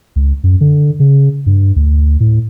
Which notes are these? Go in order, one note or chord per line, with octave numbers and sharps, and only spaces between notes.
C#2
F#2
D3
C#3
G2
D2
A2